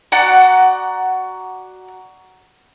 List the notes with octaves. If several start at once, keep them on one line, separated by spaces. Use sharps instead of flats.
F#4 D5 F#5 A#5